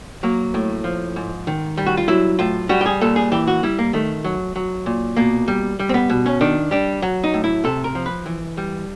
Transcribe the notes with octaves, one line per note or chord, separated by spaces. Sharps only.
F#3 A#3
A2
F3
G#2
D#3
G3
F#4
F4
F#3 E4
A2 F4
G3 F#4
G4
G#4
A#2 A4
G#4
E3 G4
F#4
G3 E4
A#3
D#3 A3
F#3
F#3
A#2
B2 A#3
G3
G3
C4
B3
B2
C#4
D#3 D4
G3 D4
F#3
D#4
A2
E4
C3 A4
A#4
F3
B4
E3
G3